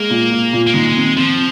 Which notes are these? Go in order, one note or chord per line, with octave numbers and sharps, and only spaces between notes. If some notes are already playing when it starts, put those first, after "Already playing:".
Already playing: G#3 A#3
A#2
F4
A#2
A#3
D#3 G#3
C4
F3 C4